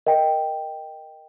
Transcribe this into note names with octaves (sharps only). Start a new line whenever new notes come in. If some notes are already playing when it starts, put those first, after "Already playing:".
A#4 D#5 G5